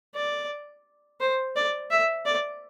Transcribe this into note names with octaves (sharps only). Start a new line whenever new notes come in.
D5
C5
D5
E5
D5